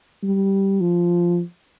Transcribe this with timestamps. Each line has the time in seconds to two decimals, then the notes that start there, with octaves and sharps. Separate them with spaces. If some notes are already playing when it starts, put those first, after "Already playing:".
0.23 G3
0.80 F3